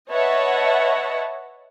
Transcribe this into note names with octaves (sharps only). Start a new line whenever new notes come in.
B4 C#5 D#5 E5 F#5 A5